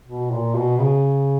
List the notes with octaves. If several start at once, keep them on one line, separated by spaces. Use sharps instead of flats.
B2
A#2
B2
C#3